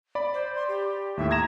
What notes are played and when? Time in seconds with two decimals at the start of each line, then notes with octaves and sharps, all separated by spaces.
0.15 D5 B5
0.34 C5
0.55 C6
0.68 G4
1.17 D#2 A2 E5
1.31 A#5 G#6 A#6 E7